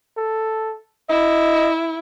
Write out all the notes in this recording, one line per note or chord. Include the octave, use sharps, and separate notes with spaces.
A4
E4 D#5